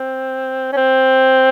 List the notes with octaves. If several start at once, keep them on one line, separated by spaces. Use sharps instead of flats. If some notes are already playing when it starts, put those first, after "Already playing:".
Already playing: C4
C#4
C4